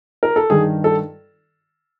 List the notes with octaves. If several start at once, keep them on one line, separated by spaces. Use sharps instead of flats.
A#4
A4
G2 D#3 G#4
A4